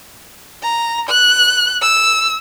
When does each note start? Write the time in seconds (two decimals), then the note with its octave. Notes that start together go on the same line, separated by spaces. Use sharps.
0.62 A#5
1.09 F#6
1.82 E6